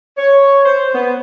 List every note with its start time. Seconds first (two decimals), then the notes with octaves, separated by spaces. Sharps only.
0.17 C#5
0.65 C5
0.94 B3